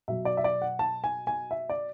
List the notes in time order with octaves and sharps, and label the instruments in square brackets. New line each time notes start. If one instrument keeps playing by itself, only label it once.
[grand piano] B2 F#3 E5
D5
E5
D5
F#5
A5
G#5
G#5
E5
D5